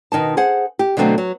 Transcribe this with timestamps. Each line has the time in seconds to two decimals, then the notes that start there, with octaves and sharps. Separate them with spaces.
0.12 B2 D#3 D#4 A5
0.37 G#4 C5 F#5
0.79 G4
0.97 B2 D3 F#3 A3 C4
1.18 F#3